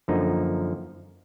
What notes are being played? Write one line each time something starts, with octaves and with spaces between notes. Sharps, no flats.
F#2 D3 F3 A#3 D#4